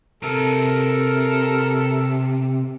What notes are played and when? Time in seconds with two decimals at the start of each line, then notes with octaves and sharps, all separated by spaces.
0.23 C3 A4 A#4